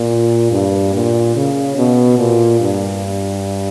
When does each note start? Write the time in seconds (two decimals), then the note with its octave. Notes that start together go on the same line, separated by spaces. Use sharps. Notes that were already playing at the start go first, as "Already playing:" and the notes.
Already playing: A#2
0.52 G2
0.94 A#2
1.36 C#3
1.77 B2
2.19 A#2
2.60 G2